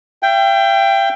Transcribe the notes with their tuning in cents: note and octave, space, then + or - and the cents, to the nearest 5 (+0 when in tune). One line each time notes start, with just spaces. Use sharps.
E5 +45 G5 +5